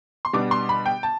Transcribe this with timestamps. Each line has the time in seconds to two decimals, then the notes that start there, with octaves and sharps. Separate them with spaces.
0.25 C6
0.33 B2 G3 B3 D4 D6
0.51 C6
0.69 B5
0.86 G5
1.03 A5